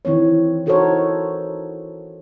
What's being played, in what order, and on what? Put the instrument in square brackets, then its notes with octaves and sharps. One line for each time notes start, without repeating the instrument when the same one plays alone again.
[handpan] D#3 E3 C4 C#5
D#4 F#4 A4 A#4 C5 C#5